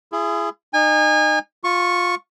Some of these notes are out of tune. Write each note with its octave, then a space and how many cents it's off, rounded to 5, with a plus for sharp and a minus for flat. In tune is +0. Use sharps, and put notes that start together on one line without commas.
E4 +40 G#4 +0
D#4 -30 G#5 -30
F4 +15 C#6 -10